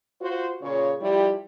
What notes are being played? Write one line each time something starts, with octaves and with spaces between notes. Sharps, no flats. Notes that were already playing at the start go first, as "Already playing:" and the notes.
F4 F#4 C5
A#2 C#3 C#5
F3 G3 E4 G4